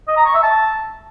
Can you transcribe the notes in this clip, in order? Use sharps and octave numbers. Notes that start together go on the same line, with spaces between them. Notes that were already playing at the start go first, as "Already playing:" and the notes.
D#5
A#5
C#6
E5
A5